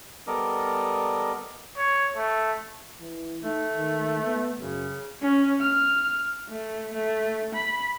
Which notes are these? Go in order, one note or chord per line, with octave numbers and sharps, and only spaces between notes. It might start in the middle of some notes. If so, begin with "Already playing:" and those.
G3 B3 A4 A#4 D5 D#5
C#5
A3
E3
A3 D#4
D#3
B3
F#2 C#3
C#4
F6
A3
A3
B5